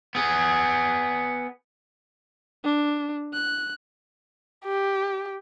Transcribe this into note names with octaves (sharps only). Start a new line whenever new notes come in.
B3 G#4
D4
F#6
G4